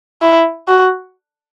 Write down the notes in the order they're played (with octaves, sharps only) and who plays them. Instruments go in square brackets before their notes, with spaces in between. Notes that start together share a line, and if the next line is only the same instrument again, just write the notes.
[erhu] E4
F#4